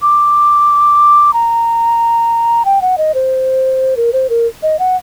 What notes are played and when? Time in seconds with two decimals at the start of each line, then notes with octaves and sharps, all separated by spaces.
0.02 D6
1.33 A#5
2.65 G5
2.82 F#5
2.98 D#5
3.14 C5
3.97 A#4
4.13 C5
4.30 A#4
4.63 D#5
4.79 F#5